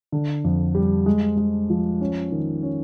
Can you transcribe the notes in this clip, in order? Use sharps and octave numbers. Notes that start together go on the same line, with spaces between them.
D3
F2
G3
G#3
G#3
F3
C#4
D#3
C#4